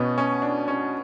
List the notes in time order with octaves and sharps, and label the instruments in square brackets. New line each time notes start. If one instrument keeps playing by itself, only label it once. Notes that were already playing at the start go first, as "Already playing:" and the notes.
Already playing: [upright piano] B2 [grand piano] B3 C#4
[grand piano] C#4
D4
C#4